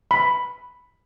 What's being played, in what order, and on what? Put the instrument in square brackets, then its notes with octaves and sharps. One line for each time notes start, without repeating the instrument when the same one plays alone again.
[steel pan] B5